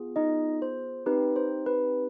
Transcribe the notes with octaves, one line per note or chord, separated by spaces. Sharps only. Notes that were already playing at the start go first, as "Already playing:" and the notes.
Already playing: B3 F4 G#4
D#4 D#5
C5
C4 D#4 G4 B4
C5
B4